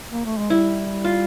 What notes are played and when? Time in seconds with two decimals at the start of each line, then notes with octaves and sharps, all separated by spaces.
0.12 A#3
0.25 A3
0.38 G#3
0.50 G3 E4
1.04 F4